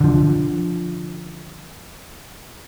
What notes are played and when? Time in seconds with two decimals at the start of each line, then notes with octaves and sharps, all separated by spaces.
0.01 D3 F3